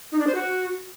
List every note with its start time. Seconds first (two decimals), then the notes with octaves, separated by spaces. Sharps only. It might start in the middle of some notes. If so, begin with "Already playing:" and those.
0.12 D#4
0.19 D4
0.27 C5
0.35 F#4